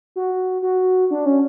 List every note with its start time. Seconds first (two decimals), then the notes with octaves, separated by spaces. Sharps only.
0.16 F#4
0.62 F#4
1.11 D4
1.26 C#4